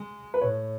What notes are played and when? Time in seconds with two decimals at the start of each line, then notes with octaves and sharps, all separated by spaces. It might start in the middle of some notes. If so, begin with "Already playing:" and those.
Already playing: G#3
0.34 B4
0.41 A2 C#5